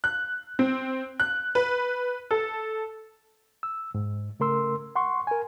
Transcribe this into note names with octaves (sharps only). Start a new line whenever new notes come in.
F#6
C4
F#6
B4
A4
E6
G#2
C#3 A3 A#4 C6 E6
F#5 C6 C#6
A#4 G#5